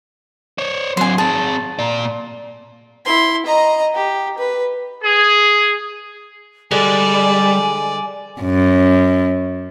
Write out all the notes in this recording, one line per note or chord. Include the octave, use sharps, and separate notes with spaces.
C5 C#5
F#3 C4 G#5 C6
C4 G#4 A5
A#2 D5
E4 C6
D#5 A#5
G4
B4
G#4
D3 G3 G#3 D5 G#5
F#2